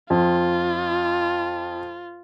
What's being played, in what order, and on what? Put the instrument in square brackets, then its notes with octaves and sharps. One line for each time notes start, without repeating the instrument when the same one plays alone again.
[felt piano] F2 [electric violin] F4